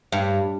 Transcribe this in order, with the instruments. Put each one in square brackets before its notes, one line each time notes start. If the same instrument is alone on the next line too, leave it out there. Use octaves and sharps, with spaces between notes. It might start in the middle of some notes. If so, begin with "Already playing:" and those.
[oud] G2